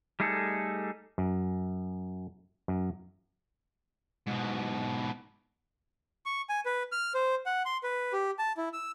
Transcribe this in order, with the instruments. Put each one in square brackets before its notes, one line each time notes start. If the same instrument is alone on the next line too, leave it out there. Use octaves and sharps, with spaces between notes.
[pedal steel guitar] G3 A3 D#4 G#4 A4
[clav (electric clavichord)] F#2
F#2
[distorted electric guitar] G#2 B2
[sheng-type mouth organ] C#6
G#5
B4
F6
C5
F#5
C6
B4
G4
A5
E4
E6